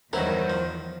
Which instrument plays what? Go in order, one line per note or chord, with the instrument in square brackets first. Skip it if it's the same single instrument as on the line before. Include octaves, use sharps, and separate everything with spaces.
[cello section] E2 D#3 [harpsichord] G2 F#3 E4 [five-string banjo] A#4 [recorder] C5
[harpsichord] F3